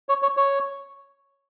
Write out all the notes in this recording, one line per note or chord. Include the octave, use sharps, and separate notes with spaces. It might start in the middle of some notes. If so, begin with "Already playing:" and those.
C#5
C#5
C#5